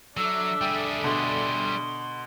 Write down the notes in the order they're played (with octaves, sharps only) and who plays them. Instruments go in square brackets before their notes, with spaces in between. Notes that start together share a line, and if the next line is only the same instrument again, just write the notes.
[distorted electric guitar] F#3 [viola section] D4 A4 E5 [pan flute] E6
[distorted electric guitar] G3 G#4 [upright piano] G5 D6
[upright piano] B2 D3 [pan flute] C6